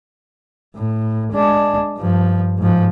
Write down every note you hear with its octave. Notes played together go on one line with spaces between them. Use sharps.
A2
G#3 D4
G2 F3
G#2 F3